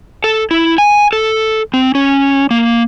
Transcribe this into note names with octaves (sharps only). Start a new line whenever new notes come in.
A4
E4
G#5
A4
C4
C#4
A#3